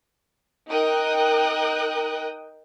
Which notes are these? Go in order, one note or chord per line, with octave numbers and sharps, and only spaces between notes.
D#4 A#4 G5 D#6 F#6